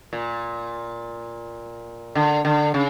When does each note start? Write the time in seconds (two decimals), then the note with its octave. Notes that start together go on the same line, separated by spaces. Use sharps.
0.13 A#2
2.15 D3
2.45 D3
2.74 C#3